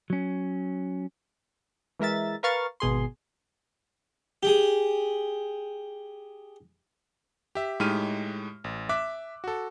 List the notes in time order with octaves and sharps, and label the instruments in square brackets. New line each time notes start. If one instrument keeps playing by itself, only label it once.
[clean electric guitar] F#3 C#4
[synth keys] E3 G#3 A#4 E5 A6
A#4 B4 F5 C#6 F6 A6
G#1 B2 G#4 C6
[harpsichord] G4 G#4
[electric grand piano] G4 E5
A2 G#3 D#4 G4 F6 D#7
A1
E5 D6 E6 F#6
F#4 A4